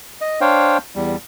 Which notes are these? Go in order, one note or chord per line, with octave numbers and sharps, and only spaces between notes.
D#5
D4 C5 C#5 F5 G5
E2 G3